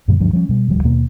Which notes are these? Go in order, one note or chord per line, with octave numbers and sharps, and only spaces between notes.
F#2 A#2 D3 G3
D2 G2 F3
F3 G3 A3 C#4
B2 G3
D1 D#2 F3 G3
D#2 B2 A#3